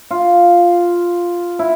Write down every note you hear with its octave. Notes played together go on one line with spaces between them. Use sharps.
F4
E4